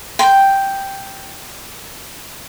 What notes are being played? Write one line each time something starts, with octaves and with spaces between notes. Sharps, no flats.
G5 C6